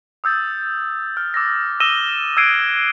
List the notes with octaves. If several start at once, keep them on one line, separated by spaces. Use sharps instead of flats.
D#6 E6 G6 A6
F6
D6 E6 A6 A#6
D#6 E6 A#6 D#7 E7 G7
E6 F#6 G#6 C7 D7 D#7